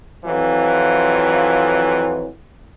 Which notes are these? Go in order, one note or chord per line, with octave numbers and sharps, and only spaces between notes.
F2 E3 F#3 F4